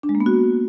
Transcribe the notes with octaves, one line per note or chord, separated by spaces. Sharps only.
D4
G#3
A#3
B3
F#4